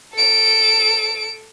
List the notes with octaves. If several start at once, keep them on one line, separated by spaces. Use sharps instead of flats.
A4 D7